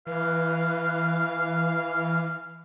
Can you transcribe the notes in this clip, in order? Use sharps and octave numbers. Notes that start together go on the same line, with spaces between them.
E3 B4 F5